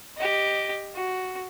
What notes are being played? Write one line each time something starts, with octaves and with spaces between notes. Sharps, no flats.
G4 D#5
F#4